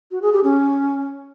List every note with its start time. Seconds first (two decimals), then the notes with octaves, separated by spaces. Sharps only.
0.11 F#4
0.22 G#4
0.33 G4
0.44 C#4